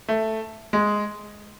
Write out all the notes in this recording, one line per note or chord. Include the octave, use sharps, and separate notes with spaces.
A3
G#3